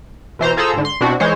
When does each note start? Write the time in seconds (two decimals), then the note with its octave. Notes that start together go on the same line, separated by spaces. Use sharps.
0.39 B2 E3 C5 A#5
0.57 F4 G#4 A4 C5 A#5 E6
0.74 G#2 D3
0.85 C6
1.01 B2 C4 D4 E4 F#4
1.20 E3 G#3 C5 C#5